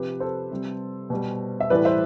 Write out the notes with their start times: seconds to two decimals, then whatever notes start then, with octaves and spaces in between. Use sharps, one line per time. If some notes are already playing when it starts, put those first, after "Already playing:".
Already playing: C3 F3 G4 B4
0.20 A4 C5
0.51 C3 G3
1.10 B2 G3
1.60 E5
1.70 A2 E3 G3 B4 D5
1.85 C5 E5